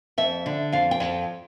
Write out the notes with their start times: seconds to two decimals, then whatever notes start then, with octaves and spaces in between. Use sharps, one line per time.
0.18 F2 E5
0.46 D3
0.72 F2 F5
0.91 G5
1.00 F2